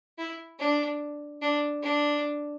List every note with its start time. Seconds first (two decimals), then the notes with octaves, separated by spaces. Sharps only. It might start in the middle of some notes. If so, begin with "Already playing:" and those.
0.18 E4
0.59 D4
1.42 D4
1.82 D4